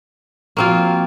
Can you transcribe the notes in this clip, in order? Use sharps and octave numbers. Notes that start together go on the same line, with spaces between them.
F3 A#3 C4 F4 F#4 C#6